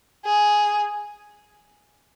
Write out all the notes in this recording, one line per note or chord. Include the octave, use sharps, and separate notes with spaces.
G#4